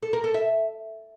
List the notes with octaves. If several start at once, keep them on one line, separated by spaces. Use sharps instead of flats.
A4
A#4
A4
E5